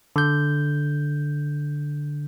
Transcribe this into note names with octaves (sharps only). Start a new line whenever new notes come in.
D3 G6